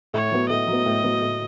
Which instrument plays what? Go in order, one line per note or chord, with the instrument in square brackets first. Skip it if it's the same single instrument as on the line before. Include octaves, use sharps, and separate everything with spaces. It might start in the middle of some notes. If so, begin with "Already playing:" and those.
[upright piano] A2 [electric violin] C#5
[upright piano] F#3 B3
[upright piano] A2 [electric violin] D#5
[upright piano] F#3
B3
A2
F#3 B3
A2